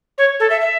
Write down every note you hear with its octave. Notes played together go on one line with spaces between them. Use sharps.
C#5
A4
E5
E5